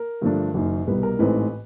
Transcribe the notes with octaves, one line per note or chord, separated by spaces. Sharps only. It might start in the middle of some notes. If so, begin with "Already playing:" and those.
Already playing: A#4
G2 D3 F3 A3 D4
F#1 F#2 D#3
C2 B2 G3 B4
A#4
A1 G#2 E3 A3 C4 B4